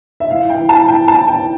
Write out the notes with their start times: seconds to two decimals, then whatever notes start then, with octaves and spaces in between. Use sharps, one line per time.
0.20 E5
0.30 A2 F5
0.50 G5
0.59 E3
0.69 A5
0.88 A2 G5
1.08 A5
1.17 E3
1.28 G5